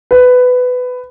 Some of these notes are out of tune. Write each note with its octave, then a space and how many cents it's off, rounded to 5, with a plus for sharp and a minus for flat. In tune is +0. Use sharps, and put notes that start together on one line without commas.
B4 +15